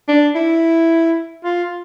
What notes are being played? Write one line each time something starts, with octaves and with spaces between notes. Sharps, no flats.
D4
E4
F4